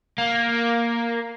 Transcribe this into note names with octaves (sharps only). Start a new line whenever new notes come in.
A#3